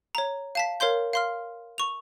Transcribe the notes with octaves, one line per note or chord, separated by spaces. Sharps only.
C#5 A#5
F5 A5 B6
A#4 C#5 F5 C6 G6
F5 C6 F6
C#6 F7